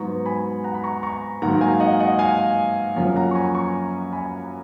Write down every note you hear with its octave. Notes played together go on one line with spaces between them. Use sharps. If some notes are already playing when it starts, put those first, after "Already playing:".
Already playing: G#2 F#3 B3 A#5 C#6
G#5 B5
F#5 A#5
B5
A#5 C#6
A#5 C#6
G#2 D#3 F#3 A#3 F#5 A#5
F5 G#5
D#5 F#5
D#5 F#5
F5 G#5
F#2 F3 A#3 C#4
F#5 A#5
C#6
G#5 B5
A#5 C#6
G#5 B5